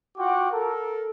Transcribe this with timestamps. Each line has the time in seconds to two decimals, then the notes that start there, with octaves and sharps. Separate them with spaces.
0.17 F4 F#4 F#5 G5 D6
0.52 A4 A#4